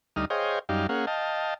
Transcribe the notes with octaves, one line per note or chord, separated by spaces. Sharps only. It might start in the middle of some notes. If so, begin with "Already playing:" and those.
D2 G3 D#4 D#6 F6
G#4 C5 C#5 D#5 F5 G5
F#2 G3 D#4 G4 F5
A#3 C#4 G#4 F5 F#5
D#5 F5 G5 A5